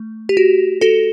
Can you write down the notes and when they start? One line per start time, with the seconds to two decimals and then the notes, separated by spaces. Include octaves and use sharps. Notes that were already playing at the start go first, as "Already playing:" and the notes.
Already playing: A3
0.29 G4
0.37 F#4
0.81 F#4 A4